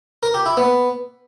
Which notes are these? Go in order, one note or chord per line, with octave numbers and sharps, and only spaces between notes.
A#4
G4
E4
B3